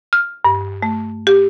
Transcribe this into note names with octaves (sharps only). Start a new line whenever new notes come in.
F6
G2
A3
G4